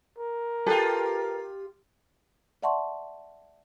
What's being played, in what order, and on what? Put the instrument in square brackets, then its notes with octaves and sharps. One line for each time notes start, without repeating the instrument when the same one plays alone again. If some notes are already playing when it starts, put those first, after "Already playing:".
[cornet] A#4
[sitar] F4 G4 [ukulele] A4 B4
[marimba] D5 E5 F#5 A5 C6 C#6